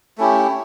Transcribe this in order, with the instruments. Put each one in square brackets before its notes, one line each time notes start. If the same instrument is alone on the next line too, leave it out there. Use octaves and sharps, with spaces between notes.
[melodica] A3 C#4 E4 G4